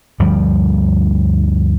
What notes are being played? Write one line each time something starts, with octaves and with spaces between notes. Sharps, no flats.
D2 G2 F3 G3